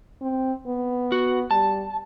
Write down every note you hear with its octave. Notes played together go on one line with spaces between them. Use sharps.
C4
B3
F#4
G3 A5